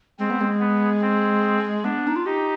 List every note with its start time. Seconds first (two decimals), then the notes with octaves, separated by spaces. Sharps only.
0.19 G#3 C4
0.30 B3
0.41 G#3
0.61 B3
1.01 C4
1.84 B3 D4
2.07 D#4
2.16 F4
2.25 D#4 G4